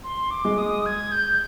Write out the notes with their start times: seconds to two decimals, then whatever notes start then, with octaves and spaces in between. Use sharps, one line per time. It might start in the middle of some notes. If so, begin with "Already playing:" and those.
0.04 C6
0.31 D6
0.45 G#3
0.58 D#6
0.86 G#6
1.12 G6